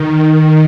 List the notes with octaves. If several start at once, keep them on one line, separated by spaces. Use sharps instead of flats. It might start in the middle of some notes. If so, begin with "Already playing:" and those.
Already playing: D#3
D#3